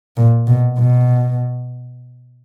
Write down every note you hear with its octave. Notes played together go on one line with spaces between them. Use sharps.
A#2
B2
B2